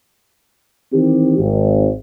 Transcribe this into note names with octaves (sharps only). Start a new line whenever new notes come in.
D#3 E3 C4 G4
G#1